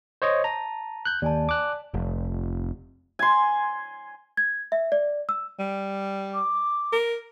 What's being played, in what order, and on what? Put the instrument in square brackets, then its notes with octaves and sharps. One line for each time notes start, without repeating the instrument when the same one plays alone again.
[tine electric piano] C5 C#5 D#5
[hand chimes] A5 [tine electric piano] A#5
[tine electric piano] F#6 G6
[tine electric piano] D#2 [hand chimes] D5 G#5 A5
[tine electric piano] D6 F#6
[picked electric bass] F1
[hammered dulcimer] G#5 C6
[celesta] G#6
E5
D5
E6
[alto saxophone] G3
[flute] D6
[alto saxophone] A#4